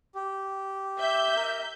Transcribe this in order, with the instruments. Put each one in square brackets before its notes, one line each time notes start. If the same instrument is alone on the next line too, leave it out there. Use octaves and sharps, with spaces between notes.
[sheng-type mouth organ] G4
[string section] E5 G6
[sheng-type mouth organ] A#4